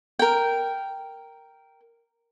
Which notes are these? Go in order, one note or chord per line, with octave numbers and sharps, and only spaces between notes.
A#4 G5